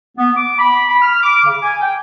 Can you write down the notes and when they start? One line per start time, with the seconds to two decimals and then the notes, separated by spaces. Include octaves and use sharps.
0.18 B3
0.37 D6
0.59 B5
0.90 B5
1.02 F6
1.23 D6
1.45 C#3
1.62 G#5
1.82 G5